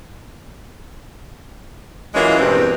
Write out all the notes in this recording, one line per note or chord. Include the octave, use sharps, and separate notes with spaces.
E3 F#3 G#3 A#3 C#4 F4
E2 G2 B2 E3 C4